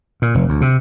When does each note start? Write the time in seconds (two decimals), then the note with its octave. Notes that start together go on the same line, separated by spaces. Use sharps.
0.22 A#2
0.35 F1
0.49 D2
0.61 C3